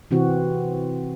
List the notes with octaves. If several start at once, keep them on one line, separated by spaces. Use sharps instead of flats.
C3 E3 C4 F#4